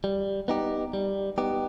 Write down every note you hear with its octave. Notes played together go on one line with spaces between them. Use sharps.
G3
B3 D#4 G4
G3
B3 D#4 G4